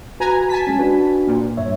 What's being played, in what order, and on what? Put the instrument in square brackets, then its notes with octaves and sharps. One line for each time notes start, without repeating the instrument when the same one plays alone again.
[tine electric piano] F#4 [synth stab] B4 G#5 A#5
[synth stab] G#5 A5 B6
[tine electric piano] G#3 C#4
D4 F#4 B4
[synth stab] A#2
[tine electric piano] G2 C#5 E5